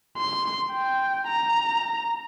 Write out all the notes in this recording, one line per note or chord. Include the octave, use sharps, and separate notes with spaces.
C6
G5
A#5